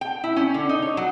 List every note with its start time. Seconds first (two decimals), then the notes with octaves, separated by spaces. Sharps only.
0.01 G5
0.24 E4
0.36 C#4
0.54 D3
0.69 D#4
0.82 C#5
0.97 F#3